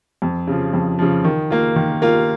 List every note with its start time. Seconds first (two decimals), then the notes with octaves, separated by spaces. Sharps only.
0.22 F2
0.47 C#3 F3
0.73 F2
0.99 C#3 F3
1.24 D#3
1.50 A#3 F4
1.76 D#3
2.02 A#3 F4